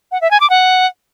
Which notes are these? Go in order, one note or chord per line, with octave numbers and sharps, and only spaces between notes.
F#5
E5
G#5
D6
F#5